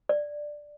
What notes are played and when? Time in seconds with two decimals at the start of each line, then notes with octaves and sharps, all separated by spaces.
0.09 D5